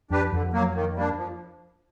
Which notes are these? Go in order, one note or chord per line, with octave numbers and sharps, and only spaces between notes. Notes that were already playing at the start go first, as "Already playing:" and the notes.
F2 D4 G4 B4
F2 D3
F#3 A#3
D#3
G3 A#3 D4
F3